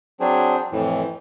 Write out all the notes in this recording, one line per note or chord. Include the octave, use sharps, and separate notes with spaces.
F#3 C4 D4 G#4
F2 A2 E3